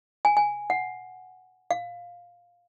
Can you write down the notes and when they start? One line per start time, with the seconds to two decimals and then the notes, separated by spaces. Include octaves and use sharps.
0.25 G#5
0.37 G#5
0.70 F#5
1.71 F5